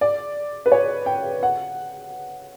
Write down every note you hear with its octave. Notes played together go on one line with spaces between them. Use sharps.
D5
B4
C#5
G5
F#5